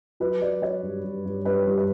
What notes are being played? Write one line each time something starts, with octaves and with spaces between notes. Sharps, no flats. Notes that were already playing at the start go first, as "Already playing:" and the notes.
F#3 B4
F#3 D5
F#3 C#5
G2
G2
G2
G2 B4
G2
B4